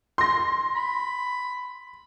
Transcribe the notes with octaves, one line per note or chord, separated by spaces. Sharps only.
C6 A#6
B5